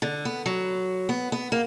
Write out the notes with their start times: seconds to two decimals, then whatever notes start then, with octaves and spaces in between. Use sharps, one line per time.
0.02 D3
0.25 B3
0.46 F#3
1.09 B3
1.32 B3
1.52 A#3